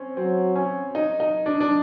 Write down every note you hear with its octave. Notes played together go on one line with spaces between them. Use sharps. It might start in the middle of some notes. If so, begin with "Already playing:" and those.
Already playing: C4 C#4
F#3 C4
C#4
D#4
D#4
D4
D4